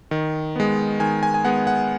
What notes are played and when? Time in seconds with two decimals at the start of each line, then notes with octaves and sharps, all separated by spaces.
0.11 D#3
0.56 G#3 B3
1.00 D#3 G#5
1.23 G#5
1.34 G#5
1.45 G#3 B3 F#5
1.67 F#5